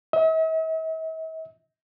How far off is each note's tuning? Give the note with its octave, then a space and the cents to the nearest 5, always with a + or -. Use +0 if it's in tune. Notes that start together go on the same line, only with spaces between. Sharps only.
E5 -45